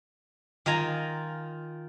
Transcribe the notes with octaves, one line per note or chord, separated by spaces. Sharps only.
D#3 F4 G#5 A#5